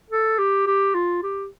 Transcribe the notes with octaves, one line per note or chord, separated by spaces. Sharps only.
A4
G4
G4
F4
G4